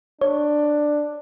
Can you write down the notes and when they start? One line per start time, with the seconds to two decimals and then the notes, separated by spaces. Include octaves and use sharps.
0.21 D4 C#5